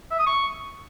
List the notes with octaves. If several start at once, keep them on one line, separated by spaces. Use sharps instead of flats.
E5
D#6
C#6